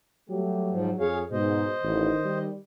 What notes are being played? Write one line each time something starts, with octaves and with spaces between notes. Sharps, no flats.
F#3 G3 A3 G4
G#2 F3
F2 G#4 C#5 F5
G#2 B2 C5 D#5
A1 D#3
G3